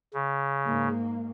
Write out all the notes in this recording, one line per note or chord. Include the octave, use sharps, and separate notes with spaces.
C#3
G#2 A#3